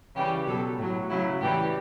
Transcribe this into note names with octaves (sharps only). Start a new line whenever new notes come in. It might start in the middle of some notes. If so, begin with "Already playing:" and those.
C#3 E3 G3 G4
B2 F#3 A4
A2 F#3
C#3 F#3 E4
A2 E3 G3 G4